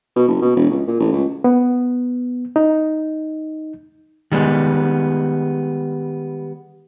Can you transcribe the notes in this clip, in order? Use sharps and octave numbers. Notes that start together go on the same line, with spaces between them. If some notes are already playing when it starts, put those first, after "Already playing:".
B2
F#1
B2
E1
C#2
A#2
A1
C#2
B3
D#4
D#3 G3 G#3 B3